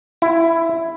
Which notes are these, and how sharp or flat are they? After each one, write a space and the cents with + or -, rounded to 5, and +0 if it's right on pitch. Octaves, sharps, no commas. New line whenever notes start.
E4 +10